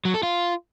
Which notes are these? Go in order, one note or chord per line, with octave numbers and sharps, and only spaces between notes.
F#3
A4
F4